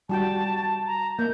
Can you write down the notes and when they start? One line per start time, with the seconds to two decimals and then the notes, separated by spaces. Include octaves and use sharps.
0.09 G3 F#4 G5 A5
0.87 A#5
1.19 A#3 G6